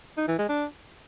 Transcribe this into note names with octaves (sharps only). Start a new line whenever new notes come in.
D#4
E3
G#3
D4